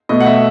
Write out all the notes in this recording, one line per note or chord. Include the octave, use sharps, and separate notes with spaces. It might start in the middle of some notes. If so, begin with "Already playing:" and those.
B2 A3 D#5
F#5
E5